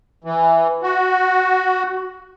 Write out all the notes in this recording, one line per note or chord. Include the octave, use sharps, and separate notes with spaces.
E3
F#4